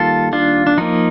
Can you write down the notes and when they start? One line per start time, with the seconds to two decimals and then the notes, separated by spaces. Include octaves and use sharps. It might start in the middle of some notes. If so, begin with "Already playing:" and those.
Already playing: D#3 G3 A#3 F4 A4
0.33 D4 F4
0.67 D4
0.78 F3 A#3 D#4